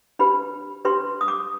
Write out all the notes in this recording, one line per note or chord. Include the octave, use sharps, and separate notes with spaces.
D4 G4 B4 B5
D4 G4 B4 C6
D#6
D6